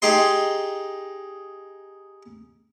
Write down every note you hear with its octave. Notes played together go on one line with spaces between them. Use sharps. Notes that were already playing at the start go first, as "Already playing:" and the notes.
D#4 G4 G#4 D#5 C6